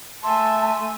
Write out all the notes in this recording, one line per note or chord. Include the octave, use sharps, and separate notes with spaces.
A3 E5 G#5 A5 C6